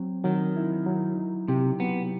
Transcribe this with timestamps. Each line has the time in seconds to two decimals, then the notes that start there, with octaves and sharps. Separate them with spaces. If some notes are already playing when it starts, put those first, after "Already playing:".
Already playing: F#3 C4
0.24 D#3 F#3
0.56 E4
0.86 F#3
1.18 D#4
1.48 C3 G4
1.80 F#3 B3